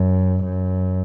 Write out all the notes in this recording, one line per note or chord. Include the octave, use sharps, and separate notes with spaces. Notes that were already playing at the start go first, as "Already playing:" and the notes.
Already playing: F#2
F#2